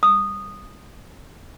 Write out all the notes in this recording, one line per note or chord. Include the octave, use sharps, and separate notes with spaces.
D#6